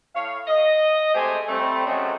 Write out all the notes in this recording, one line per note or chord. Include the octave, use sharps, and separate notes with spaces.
A2 C#5 F5
D#5
G#3 A3 C4 G4 C5 G#5
G3 A3 C4
F#2 F#3 G#3 A3 C4 C#4